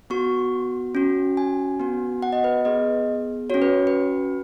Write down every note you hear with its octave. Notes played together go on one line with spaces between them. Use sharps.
B3 F#4 C#6
C#4 F#4
G#5
B3 F#4
F#5
D#5
B4
B3 G#4 D#5
C#4 F#4 C#5
B4
B4